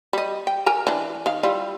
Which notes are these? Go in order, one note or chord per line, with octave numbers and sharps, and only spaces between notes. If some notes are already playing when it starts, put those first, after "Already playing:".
G3 D#5
G5
A#4 G#5 A#5
E3 D4
D#3 F5
G3 E4 F4